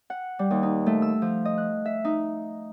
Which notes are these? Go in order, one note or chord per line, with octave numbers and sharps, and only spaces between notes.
F#5
G3
D#2
D#4
A3
E6
F3
D#5
F#6
E5
D#4